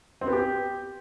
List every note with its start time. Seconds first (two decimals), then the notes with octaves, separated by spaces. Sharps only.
0.21 C4
0.27 B3
0.33 G4